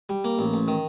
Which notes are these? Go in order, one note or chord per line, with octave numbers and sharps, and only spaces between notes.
G3
A#3
A1
A1
D#3